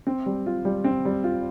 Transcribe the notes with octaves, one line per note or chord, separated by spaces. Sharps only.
C4
G3
F4
G3
C4
G3
F4